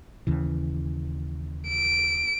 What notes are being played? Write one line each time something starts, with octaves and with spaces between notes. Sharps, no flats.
D#2 C#3 E3
D7